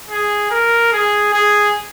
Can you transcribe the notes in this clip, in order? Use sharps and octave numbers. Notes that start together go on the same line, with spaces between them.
G#4
A#4
G#4
G#4